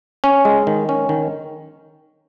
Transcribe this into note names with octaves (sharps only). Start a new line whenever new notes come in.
C#4
G#3
D#3
C#4
D#3